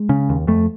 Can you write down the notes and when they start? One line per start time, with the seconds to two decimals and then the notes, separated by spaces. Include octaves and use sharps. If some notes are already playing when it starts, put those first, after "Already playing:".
Already playing: G#3
0.09 C#3
0.29 D#2
0.47 F2 A3